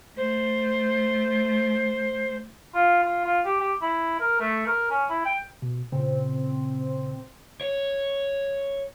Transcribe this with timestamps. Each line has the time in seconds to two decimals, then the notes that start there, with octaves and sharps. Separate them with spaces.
0.17 A3 C5
2.74 F4
3.03 F4
3.25 F4
3.45 G4
3.60 G4
3.82 E4
4.20 A#4
4.40 A3
4.67 A#4
4.90 C#4
5.09 E4
5.25 G5
5.62 B2
5.92 A#2 C#3 C4
7.61 C#5